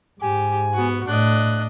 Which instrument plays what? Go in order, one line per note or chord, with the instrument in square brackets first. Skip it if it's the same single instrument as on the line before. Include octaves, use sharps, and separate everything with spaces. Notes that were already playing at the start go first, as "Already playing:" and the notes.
[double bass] G#2 [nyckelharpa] G4 [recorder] G#5
[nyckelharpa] B3 F#4
[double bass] A2 [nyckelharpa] D4 D#5 [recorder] F#6